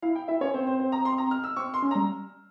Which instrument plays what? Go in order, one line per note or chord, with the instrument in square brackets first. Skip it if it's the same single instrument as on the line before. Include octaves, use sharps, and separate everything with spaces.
[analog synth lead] E4 [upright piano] F5
[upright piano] G5
[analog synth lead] E4 [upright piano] E5
[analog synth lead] C#4 [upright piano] C#5
[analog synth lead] C4 [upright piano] C5
[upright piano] C5
C5
A#5
C6
A#5
F6
E6
[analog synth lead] C4 [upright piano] C#6
[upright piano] C6
[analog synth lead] C#4
[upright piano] A#5
[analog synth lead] G3